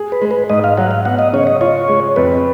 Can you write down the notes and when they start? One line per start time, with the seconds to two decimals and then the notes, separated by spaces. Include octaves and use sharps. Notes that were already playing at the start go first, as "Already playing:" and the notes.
Already playing: G#4
0.12 B4
0.21 G#3
0.31 B4
0.50 G#2 D#5
0.64 F5
0.78 F#3 F#5
0.91 F5
1.05 B3 F#5
1.19 D#5
1.33 C#3 C#5
1.47 D#5
1.61 F4 C#5
1.89 G#3
2.16 F2 B4